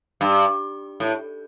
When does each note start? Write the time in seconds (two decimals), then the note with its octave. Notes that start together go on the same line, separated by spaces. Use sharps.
0.21 G2
1.00 A2